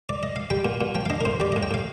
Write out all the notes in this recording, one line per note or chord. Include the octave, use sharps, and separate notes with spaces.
D5
D#5
F5
G3 G5
A#2
A#2
F3 G5
F5
D4 D#5
A#4
A2 C5
G3 D5
D#5
A2
G5
A2 F5